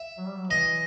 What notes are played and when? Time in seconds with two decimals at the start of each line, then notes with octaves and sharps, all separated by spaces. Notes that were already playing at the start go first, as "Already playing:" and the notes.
Already playing: E5
0.18 F#3
0.26 G3
0.36 F#3
0.50 E3 D#5